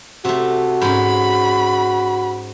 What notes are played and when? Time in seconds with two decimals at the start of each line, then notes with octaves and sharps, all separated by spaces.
0.25 C3 A3 F#4
0.81 G#2 C#4 B5